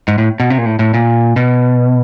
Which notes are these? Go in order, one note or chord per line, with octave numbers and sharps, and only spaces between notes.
G#2
A2
B2
C3
A#2
A2
A2
A#2
B2